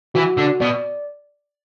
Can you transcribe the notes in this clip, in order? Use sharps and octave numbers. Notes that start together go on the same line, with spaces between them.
E3 F#4
D3
B2 D5